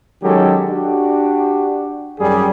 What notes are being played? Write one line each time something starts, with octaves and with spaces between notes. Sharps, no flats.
D#3 F#3 G#3 C#4 G4 A4
D4 F#4 G4
G#1 F#2 G3 G#4